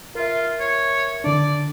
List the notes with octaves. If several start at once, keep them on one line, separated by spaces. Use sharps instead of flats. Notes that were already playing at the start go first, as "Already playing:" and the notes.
F4 A#4 E5
C#5
D3 D4 D5